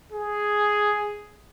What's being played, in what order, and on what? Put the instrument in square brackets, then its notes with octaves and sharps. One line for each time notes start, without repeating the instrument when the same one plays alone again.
[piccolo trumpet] G#4